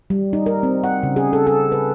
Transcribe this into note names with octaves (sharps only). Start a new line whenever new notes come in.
G3
D#4
A#4
C4
F#5
C#3
G#4
A4
A4
B4